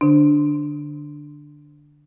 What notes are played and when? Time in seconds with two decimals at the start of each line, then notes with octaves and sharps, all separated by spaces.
0.01 D3 D4